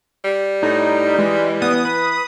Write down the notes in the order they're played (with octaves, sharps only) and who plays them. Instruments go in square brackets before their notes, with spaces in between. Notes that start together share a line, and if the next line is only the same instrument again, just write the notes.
[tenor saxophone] G3
[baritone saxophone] A2 [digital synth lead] D#4
[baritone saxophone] E3 [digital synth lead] G#3
[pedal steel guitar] B3 [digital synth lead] D#6
[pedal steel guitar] B4